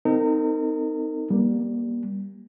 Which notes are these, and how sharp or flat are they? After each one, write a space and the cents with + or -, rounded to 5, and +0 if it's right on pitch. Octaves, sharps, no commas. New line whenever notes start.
C4 -35 D#4 +0 A#4 -40
G3 +0 A#3 +30